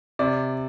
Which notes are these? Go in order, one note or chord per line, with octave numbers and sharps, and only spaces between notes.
C3 D5